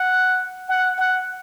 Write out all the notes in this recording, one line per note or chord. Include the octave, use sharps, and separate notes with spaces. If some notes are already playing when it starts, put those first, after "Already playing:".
Already playing: F#5
F#5
F#5